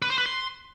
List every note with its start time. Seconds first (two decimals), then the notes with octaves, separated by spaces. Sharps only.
0.02 B4
0.10 C5
0.18 B4
0.26 C6